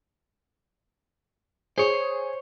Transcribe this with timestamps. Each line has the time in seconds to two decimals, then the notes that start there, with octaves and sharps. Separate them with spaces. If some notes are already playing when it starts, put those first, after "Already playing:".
1.78 G#4 C5 C#5